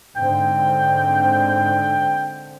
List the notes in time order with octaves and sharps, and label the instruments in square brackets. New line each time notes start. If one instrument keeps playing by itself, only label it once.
[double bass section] G#2 D3 C4 [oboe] G5